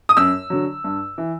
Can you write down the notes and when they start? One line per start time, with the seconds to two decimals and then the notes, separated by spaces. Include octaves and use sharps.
0.09 D#6
0.17 F#2 E6
0.50 D3 F#3
0.84 G2
1.18 E3